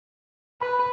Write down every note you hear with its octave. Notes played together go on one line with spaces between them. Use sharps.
B4 B5